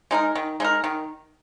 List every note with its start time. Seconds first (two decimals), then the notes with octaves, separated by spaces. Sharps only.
0.11 G#3 D#4 A#4
0.35 D#3
0.60 G#3 D#4 A#4
0.84 D#3